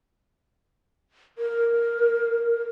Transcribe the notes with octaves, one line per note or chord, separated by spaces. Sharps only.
A#4